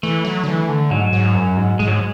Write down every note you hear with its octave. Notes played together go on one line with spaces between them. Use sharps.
E3 A3
F#3
D3
E3
D3
G#2 F#3
G#2
F#2
G#2
G#2 G#3
F#3
G#3